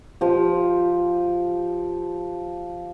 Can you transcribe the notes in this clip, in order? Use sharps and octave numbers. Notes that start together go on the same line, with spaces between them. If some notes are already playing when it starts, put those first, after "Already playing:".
F3 G4